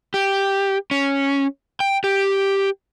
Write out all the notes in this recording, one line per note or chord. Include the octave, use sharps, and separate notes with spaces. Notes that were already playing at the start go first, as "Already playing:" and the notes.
G4
C#4
G5
G4